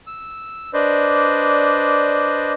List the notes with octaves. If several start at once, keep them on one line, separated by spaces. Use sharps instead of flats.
E6
D4 B4 C5 D5 D#5